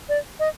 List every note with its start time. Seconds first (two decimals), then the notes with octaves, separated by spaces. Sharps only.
0.09 D5
0.39 D#5